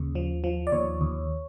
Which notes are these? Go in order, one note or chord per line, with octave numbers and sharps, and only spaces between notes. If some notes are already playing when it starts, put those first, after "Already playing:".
Already playing: D#2 C#3
F3
F3
D5
D#2 C#5
D#2